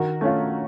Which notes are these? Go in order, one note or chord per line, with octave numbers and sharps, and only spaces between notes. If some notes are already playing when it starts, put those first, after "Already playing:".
Already playing: D#3 F#4 A#4
A3 C#4 F4